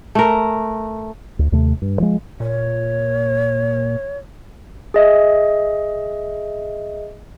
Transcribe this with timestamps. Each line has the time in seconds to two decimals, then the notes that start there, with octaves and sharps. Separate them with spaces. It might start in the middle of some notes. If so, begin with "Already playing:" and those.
0.15 A3 A#4
1.39 D2
1.52 D#2 C3 A3
1.82 G2
2.00 F3 G#3
2.40 A#2 C#5
4.94 G#4 D#5 E5